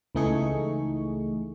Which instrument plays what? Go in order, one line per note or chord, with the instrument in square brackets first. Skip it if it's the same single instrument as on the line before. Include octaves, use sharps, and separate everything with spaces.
[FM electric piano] C#2 E3 A3 D#4 G#4 C#6